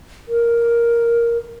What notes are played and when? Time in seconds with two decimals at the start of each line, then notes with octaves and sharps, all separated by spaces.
0.28 A#4